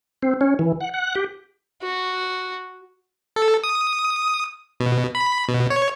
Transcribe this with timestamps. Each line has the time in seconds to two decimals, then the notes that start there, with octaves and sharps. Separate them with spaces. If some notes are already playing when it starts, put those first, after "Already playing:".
0.23 C4
0.41 C#4
0.59 E3
0.81 F#5
0.94 F#5
1.15 G4
1.82 F#4
3.36 A4
3.64 D#6
4.80 B2
5.15 B5
5.48 B2
5.70 C#5